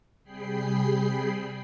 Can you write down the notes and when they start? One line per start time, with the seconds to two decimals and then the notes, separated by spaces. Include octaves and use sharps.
0.23 C3 G3 G#4 G5 B5 C7